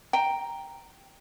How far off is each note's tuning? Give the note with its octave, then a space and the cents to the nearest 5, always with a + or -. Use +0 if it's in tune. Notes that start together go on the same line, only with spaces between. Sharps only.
G5 +0 A#5 +0